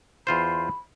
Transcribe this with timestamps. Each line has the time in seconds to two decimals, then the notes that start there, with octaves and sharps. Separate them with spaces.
0.27 E2 F4 C5 B5